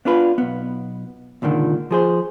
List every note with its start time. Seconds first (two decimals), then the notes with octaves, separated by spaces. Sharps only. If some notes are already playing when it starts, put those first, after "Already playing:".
0.05 B3 D4 F4 B4
0.38 B1 B3
1.42 C#2 A#2 D3 D#3
1.91 F3 G#4 C5